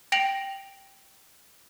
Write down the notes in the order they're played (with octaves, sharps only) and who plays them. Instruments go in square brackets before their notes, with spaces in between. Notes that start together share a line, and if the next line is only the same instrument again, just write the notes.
[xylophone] G5 A#6 D7 F7 F#7